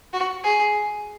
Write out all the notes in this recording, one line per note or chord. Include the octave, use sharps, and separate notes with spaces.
F#4
G#4